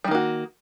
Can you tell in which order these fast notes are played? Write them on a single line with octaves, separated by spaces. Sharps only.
G3 D#3 A#3 F#4